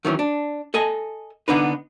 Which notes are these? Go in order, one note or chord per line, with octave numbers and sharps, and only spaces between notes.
D#3 E3 F#3 C#4
D4
A4 D#5 G#5
D3 B3 D4 D#4 B4